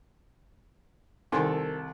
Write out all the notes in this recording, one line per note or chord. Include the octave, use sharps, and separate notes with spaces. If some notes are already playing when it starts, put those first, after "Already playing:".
C2 D#3 D#4 A4 A#4 G5 G#5 C6